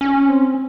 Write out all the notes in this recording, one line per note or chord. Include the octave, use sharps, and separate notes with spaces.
C#4
C4